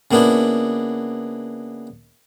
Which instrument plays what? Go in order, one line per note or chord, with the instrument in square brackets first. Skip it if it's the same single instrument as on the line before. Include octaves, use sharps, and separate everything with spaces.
[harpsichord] C#3 A#3 B3 D4 E4